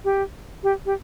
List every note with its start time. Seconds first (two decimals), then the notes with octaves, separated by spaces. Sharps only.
0.05 G4
0.63 G4
0.86 G4